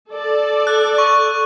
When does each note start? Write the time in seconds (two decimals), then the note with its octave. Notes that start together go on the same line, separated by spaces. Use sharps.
0.11 A4 D5
0.67 F#6
0.98 C#6